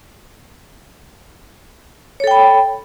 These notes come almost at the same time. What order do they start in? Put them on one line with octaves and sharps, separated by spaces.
C#5 A4 G5 B5